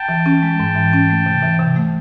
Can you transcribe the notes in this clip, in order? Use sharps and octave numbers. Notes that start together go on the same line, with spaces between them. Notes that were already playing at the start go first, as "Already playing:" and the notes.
Already playing: G5 A5
E3
C#4
G#3
G#2
E3
C#4
A3
C3
E3
C3
A3